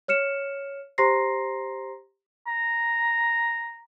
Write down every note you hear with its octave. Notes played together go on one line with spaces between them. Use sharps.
C#5 F6 C#7 E7
G4 C5 A#5 C6 A#6 C7
A#5